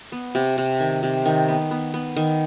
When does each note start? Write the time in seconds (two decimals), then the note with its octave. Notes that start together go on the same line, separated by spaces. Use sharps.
0.12 B3
0.35 C3
0.58 C3
0.80 D#3
1.03 C3
1.25 D#3
1.48 B3
1.71 B3
1.94 B3
2.16 D#3